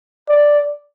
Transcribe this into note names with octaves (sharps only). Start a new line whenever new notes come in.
D5